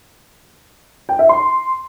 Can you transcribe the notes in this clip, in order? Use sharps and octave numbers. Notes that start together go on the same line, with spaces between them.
G5
E5
C6